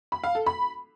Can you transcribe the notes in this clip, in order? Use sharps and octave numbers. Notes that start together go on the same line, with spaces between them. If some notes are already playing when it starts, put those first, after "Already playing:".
B5
F5
A4
B5